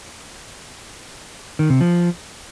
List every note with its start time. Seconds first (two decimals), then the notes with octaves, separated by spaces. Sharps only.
1.59 D#3
1.70 C3
1.81 F3